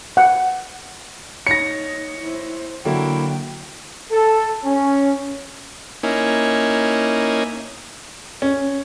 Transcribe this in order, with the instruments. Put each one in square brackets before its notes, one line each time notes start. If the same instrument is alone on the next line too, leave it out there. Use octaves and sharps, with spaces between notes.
[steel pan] F#5
[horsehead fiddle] D#4 [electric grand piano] C#5 [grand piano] A#6 C#7
[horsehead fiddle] E4 C5
[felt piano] D3 F#3 [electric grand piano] A#3 E4 [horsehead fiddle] G5
[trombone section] A4
C#4
[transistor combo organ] A#3 C#4 D#4 E4 G#5
[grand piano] C#4